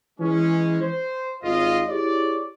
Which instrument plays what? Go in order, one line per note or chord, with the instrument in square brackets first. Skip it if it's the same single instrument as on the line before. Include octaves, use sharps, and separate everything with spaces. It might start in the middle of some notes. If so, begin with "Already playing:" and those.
[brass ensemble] E3 G#3 C#4
C5
G#1 F4 D#5
E4 G4 G#4 C#5 D5